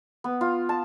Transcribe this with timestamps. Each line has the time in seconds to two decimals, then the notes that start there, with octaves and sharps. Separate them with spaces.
0.24 B3
0.41 F4
0.69 A5